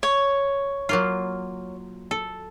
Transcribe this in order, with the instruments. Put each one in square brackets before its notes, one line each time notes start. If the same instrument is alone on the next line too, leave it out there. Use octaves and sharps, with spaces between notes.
[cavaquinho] C#5
[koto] F#3 A#3 F4
A4